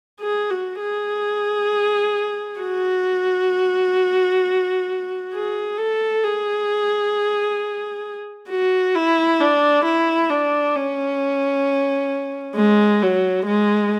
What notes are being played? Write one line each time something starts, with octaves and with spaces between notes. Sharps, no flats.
G#4
F#4
G#4
F#4
G#4
A4
G#4
F#4
E4
D4
E4
D4
C#4
G#3
F#3
G#3